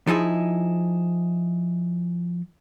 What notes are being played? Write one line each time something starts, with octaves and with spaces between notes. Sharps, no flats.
F3 D#4 E4 G#4